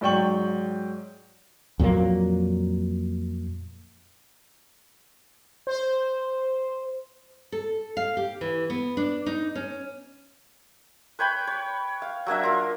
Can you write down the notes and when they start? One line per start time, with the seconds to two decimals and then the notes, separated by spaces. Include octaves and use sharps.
0.01 G#2 F#3 D5 G5 C#6 F#7
1.80 F2 A#2 F#3 A#3
5.67 C5
7.52 A4
7.97 F5
8.17 G4
8.41 E3
8.70 B3
8.97 D4
9.26 D#4
9.55 C#4
11.19 B4 C#5 G5 B5
11.47 C#5
12.02 F5
12.26 F#3 A#3 D4 E5
12.43 F4 A#4